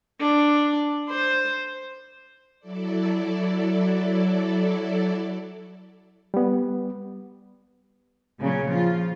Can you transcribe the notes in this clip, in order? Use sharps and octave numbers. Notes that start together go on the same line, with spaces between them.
D4
C5
F#3 E4 A4 D5
G3 B3
A#2 C#3 F#3 C#4
F3 F4